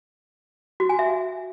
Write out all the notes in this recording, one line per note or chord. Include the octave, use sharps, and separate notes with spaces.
F#4
G#5
E5